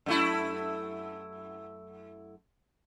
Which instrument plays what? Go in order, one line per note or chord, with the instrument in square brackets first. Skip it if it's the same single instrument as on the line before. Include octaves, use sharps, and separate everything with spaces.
[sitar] F#2 A3 E4